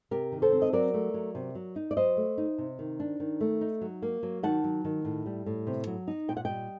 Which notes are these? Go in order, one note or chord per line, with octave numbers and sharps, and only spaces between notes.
C3 G4 A#4
D#3
A4 C5
C4
D#5
F#3 A#4 D5
A3
F#3
C3
F#3
D#4
D5
F#3 C5 D#5
A3
D#4
C3
D#3
D4
D#3
A3
D#4
F#3
A#3
F#3
D#3 F#5 A5
F#3
D#3
A2
G3
A2
C3
F#3
D#4
A#2 G5
F#5
G3 D#5 G5